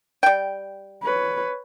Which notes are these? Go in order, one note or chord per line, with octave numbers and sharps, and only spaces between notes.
G3 G5
B4 C#5